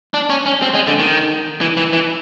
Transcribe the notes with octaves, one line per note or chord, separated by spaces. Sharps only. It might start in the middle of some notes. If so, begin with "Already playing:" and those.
D4
C#4
C#4
C4
G#3
D3
D#3
E3
E3
E3